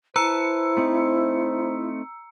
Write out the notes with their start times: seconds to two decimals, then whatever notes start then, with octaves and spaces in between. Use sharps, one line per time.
0.16 E4 B4 C5 A5 A#5 E6 C#7
0.77 A3 C4 D#4